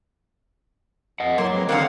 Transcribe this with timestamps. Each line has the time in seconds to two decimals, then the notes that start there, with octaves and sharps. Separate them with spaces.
1.20 F2 D#5 F#5
1.38 A2 F#3 A#3 C6
1.53 E3 G#3 C4
1.69 D#2 D3 D#3 A#3 C4 F5 F#5